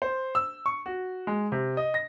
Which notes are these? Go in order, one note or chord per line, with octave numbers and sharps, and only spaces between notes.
C5
E6
C#6
F#4
G#3
C3
D#5
A#6